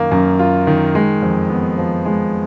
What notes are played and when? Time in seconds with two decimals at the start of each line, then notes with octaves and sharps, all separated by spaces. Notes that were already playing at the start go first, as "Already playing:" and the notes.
Already playing: F#2 D#3 A#3
0.12 F#2
0.39 F4
0.67 D#3
0.95 G#3
1.23 F2
1.50 B3
1.78 F3
2.06 G#3